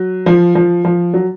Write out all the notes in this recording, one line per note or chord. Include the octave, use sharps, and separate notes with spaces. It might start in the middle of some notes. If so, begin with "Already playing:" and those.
Already playing: F#3
F3
F3
F3
F#3